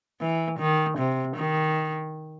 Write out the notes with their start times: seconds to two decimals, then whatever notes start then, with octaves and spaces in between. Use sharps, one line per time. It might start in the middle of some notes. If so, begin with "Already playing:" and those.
0.21 E3
0.59 D#3
0.98 C3
1.36 D#3